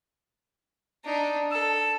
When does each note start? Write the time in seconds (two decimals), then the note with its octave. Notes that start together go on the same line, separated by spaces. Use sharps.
1.04 D4 D#4
1.51 A4 E6